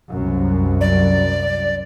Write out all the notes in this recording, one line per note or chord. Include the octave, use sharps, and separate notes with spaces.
C2 F#2
D5